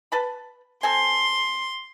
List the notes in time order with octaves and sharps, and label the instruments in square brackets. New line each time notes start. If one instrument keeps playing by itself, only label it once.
[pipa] B4 A5 B5
[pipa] C4 A4 G#5 [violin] C6